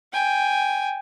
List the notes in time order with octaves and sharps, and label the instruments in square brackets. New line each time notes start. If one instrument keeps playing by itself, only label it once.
[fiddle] G5 G#5